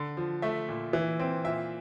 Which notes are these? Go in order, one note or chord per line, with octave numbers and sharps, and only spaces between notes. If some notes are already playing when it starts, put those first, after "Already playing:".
Already playing: D3
F3
A3 E5
A#2
E3
C4
A#2 E5